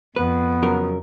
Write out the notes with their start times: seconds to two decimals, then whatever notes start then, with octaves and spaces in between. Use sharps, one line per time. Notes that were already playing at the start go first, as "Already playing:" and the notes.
0.16 F2 B3 B4
0.63 C#3 F#3 A#4